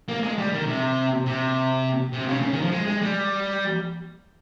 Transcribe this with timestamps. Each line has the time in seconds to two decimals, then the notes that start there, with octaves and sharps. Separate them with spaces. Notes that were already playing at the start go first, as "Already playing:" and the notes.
0.08 A#3
0.23 G#3
0.38 G3
0.52 D#3
0.66 C3
1.26 C3
2.13 C3
2.28 C#3
2.43 C#3
2.52 D#3
2.62 F3
2.72 G#3
2.87 G#3
3.02 G3